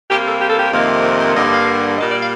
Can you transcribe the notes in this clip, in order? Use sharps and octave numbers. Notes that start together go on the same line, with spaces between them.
C3 G3 A#3 G4
A4
G4
A4
G4
F2 C3 D#3 A#3
A#4
C5
G2 D3 G3 A#3 D#5
F5
A#2 G3 A#3 D#5
D5
F5